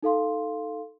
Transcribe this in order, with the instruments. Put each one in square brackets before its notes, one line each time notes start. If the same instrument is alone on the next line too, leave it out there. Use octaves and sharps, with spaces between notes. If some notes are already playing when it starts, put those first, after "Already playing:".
[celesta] D#4 A4 F5 C6